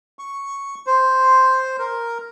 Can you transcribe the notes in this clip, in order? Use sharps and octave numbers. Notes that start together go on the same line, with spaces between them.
C#6
C5
A#4